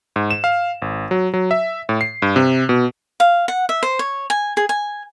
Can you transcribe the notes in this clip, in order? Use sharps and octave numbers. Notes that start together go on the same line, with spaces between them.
G#2
E7
F5
G#1
F#3
F#3
E5
A2
C7
G2
C3
B2
F5
F#5
E5
C5
C#5
G#5
G#4
G#5